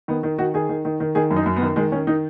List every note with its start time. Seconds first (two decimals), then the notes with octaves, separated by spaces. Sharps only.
0.08 D#3 B3
0.23 D#3
0.39 D#3 F#4
0.54 D#3 G#4
0.69 D#3
0.85 D#3
1.00 D#3
1.15 D#3 G#4
1.31 F#2
1.36 D#4
1.46 F#2
1.56 B3
1.61 D#3
1.76 D#3 G#3
1.92 D#3 C#4
2.07 D#3 D#4